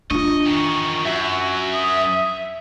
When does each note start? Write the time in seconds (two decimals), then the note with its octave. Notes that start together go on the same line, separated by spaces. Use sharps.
0.11 D4 F4 D#5 C#6
0.45 E2 D#3
1.05 F#2 F#4 E5
1.75 D#6